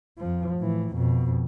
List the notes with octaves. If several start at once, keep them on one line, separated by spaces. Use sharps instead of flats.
F2 F3
A2 E3
F2 B2